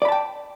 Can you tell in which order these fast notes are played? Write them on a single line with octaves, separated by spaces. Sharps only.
D5 B5 A5 G5